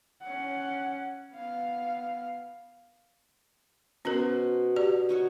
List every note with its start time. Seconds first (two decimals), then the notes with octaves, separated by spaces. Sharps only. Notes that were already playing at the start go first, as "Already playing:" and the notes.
0.22 C#4 F#5
1.34 B3 F5
4.05 B2 C#4 A#4 C5
4.76 G4 D5
5.09 D#4 F#4 C#5